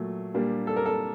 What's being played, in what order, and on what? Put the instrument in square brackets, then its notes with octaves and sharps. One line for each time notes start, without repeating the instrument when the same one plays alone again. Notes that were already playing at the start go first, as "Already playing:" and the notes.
Already playing: [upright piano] A#2 F#3 A3
A#2 G3 A#3 D4 G4
[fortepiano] A4
A#4
A4